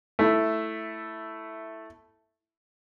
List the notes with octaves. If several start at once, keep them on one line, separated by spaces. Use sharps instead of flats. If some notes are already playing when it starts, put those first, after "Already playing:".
A3 E4